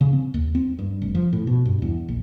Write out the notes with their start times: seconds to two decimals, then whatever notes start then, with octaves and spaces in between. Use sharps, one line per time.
0.01 C#3
0.13 C4
0.34 D#2
0.55 C4
0.79 G2
1.02 F1
1.15 F3
1.33 A2
1.47 B2
1.65 G2
1.82 E2
2.08 A#1